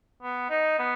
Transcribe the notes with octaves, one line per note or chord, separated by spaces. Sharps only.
B3
D#4
B3